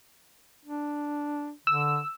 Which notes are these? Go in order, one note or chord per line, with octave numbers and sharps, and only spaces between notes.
D4
D3 E6